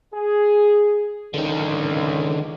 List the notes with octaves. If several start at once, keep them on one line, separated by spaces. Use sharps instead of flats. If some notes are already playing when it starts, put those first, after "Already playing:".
G#4
C#2 D3 D#3